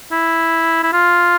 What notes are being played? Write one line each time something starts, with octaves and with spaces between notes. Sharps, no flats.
E4
E4
F4